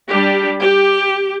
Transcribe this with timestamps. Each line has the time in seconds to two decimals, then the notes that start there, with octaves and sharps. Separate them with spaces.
0.08 G3 D4 G4
0.60 G4